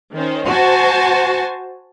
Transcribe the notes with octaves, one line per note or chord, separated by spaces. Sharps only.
D#3 C#4 C5
F#4 C5 G#5 A5